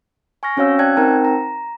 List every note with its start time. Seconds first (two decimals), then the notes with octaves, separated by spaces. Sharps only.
0.43 G#5 C#6 F6 A#6
0.57 C4 C#4 F#4 C#5 F5 E6
0.79 D5 G5 A5 F#6 G#6
0.97 C4 D#4 A#4 G5 A5 A#5
1.25 A#5